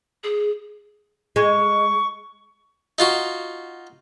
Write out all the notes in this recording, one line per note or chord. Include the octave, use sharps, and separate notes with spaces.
G#4
G#3 C#6
D#4 F4 F#4